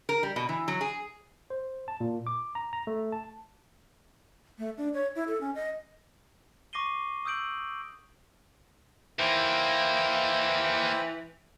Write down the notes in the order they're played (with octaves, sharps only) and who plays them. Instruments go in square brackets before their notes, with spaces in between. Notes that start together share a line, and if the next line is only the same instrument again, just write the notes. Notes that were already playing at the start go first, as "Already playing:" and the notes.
[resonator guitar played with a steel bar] A#4
G3
B2
E3
F#3
G#4
[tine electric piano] C5
A5
A#2
D6
A#5
A#5
A3
A5
[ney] A3
D4
C#5
E4
A4
C#4
D#5
[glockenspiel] C#6 D6 A#6 C7 D#7 G7
D#6 E6 G6 D7 F#7
[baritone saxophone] E3 [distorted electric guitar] A#3 D#4 [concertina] E4 C5 G5